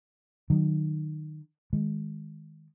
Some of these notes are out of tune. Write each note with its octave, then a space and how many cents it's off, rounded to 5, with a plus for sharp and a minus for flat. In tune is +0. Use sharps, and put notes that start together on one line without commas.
D#3 -25 F#3 +0
D#3 +15 G#3 +0